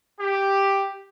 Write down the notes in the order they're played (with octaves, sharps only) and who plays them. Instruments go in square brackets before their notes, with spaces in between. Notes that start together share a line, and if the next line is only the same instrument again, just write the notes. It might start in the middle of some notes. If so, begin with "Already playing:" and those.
[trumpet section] G4